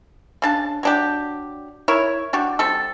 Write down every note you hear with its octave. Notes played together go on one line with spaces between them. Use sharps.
C#3 D4 A5
F#3 D4 G4
E4 A#4 C#5
D4 F#4 G4
G3 C4 A4